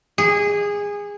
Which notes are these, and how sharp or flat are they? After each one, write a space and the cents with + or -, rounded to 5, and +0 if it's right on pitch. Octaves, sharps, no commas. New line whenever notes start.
G#4 -20